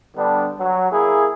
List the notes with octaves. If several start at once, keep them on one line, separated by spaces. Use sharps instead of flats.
D3 G3 B3 D4
F#3
A#3 E4 G#4